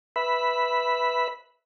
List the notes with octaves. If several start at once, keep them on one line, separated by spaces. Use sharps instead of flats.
B4 E5 B5